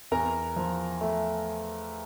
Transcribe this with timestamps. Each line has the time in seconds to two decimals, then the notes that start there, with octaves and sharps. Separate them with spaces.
0.11 E2 A#4 A#5
0.56 F3
1.01 A3